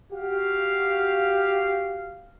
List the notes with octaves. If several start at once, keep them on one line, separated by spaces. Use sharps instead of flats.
F#4 G4 F5